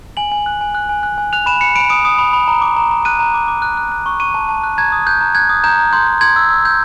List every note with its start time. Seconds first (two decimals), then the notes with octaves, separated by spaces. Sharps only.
0.17 G#5 F#7
0.32 G#5
0.46 F#6
0.61 G#5
0.75 F#6
0.89 G#5
1.03 F#6
1.18 G#5
1.33 F#6 F7
1.46 B5 E7
1.61 B5 C#7
1.76 B5 D7
1.90 D#6 D7
2.05 D#6
2.19 B5
2.33 B5
2.48 A#5
2.62 D6
2.76 A#5
2.91 A#5
3.05 F#6 D#7
3.19 A#5
3.34 D6
3.48 D6
3.62 F#6
3.77 F#6
3.92 F#6
4.06 C#6
4.20 C#6 D#7
4.34 A5
4.49 A5
4.63 F#6
4.78 A#5 G#6
4.92 D#6
5.06 F#6 G6
5.21 A#5
5.35 F#6 G#6
5.49 D#6
5.64 A#5 G6
5.78 A#5
5.93 C6 G6
6.07 G6
6.21 C6 G#6
6.36 E6
6.50 E6
6.65 G6